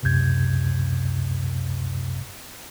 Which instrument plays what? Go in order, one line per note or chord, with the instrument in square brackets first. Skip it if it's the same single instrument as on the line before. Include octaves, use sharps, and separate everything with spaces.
[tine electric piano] C#2 F#2 C3 G6 G#6